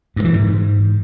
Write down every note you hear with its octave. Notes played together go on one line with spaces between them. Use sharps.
G2
E3
G#2